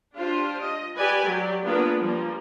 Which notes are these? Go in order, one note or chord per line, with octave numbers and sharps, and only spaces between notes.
D4 F4 G4 C5
D#5
G4 B4 D5 G#5
F#3 G4 D5
A#3 B3 D4 F4 G#4 B4
F3 G3 A#3